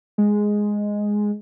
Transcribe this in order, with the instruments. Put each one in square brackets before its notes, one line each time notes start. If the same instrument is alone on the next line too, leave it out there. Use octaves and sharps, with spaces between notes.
[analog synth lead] G#3